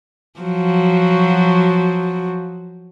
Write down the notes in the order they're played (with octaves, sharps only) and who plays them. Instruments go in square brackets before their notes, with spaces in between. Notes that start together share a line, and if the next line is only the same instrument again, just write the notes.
[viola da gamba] F3 F#3 F#4